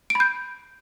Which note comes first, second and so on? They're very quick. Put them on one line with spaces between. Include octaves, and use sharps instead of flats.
D7 B5 G6